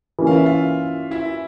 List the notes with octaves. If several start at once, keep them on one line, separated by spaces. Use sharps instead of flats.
E3 A#3 C#4
F5
E5
F4 F5
E4 E5